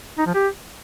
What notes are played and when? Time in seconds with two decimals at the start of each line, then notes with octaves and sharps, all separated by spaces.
0.19 D#4
0.26 F3
0.34 G4